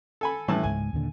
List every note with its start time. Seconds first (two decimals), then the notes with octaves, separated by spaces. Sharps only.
0.21 A4 G#5 B5
0.48 A2 E3 G3 A5
0.63 C#2 G#2 G#5
0.93 D#2 A#2 D3